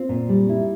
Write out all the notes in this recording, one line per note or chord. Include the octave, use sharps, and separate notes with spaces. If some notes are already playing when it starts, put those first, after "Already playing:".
Already playing: C4 F4
A#2
G3
E4